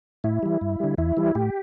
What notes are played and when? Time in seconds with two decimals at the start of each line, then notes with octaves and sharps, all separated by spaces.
0.24 A2 E4
0.43 E3 G3
0.61 G2
0.80 D3 G3
0.98 E2 E4
1.17 E3 G3
1.35 A2 G4